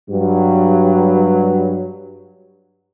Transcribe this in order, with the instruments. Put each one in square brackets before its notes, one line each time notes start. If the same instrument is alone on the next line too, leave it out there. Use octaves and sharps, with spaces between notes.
[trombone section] G2 F#3